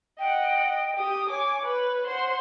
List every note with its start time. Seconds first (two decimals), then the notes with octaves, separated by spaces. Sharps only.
0.19 D#5 F#5 G5
0.64 D#5
0.97 G4 D#6
1.30 C#5 G#5 D6
1.65 B4
2.08 C5 F#5